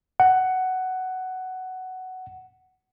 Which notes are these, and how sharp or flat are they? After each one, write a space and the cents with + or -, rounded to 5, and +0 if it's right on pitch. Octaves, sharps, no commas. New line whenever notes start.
F#5 +10